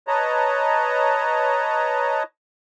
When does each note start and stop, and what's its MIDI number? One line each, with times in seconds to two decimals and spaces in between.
0.08 2.23 71
0.08 2.23 73
0.08 2.23 75
0.08 2.23 81
0.08 2.23 82